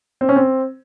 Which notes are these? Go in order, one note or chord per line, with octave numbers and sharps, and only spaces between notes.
C4
C#4
C4